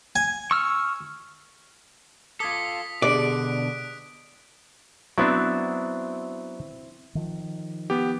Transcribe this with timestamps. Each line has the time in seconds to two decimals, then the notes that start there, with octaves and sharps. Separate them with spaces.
0.16 G#5
0.51 C#6 E6 F6
2.40 F4 A4 D6 D#6 G#6 B6
3.02 B2 D3 D4 G4 G#4 D5 F#6 D7
5.18 F#3 B3 C4 D4 E4
7.15 D#3 F3
7.90 B3 G4